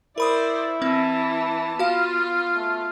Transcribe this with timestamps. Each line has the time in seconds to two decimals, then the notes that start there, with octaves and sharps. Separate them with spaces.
0.18 E4 A#4 C5 D5 B5 D#6
0.82 E3 C4 A5
1.79 B3 F4 F#4 F5
2.56 A3